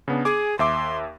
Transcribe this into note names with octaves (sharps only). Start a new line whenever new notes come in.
C#3 B3 D4
G#4 G#5 D6
D#2 E5 C6 D6